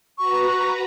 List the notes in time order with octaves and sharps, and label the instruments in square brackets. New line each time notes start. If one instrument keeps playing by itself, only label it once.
[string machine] F#4 B4 A#5 [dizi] C#6